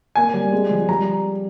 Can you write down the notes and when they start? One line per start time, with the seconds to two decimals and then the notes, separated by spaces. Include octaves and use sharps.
0.16 A#3 G#5
0.34 G3
0.52 G#3
0.71 F3
0.89 G3 A#5